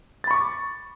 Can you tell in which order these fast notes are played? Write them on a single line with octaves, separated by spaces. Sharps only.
A6 B5 C#6 D6